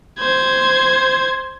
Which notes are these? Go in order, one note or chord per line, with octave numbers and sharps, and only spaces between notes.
C5 G#6